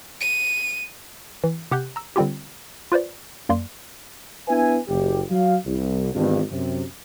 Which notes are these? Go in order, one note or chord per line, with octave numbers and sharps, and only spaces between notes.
D#7
E3
C3 G4 F#5 F#6 G6
A#5 E6
D3 G3 C4 F4 G4
F4 B4 C5 D5
F#2 A#3 D5 C6
B3 D4 E4 B4 E5 G#5
F#1 G4
F#3 F5
C2
G#1 E2 G2
F#2 C3